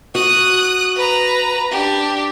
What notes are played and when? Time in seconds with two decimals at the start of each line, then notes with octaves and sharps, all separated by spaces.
0.15 F#4 D#6 F#6
0.96 B4 A#5
1.71 D4 G4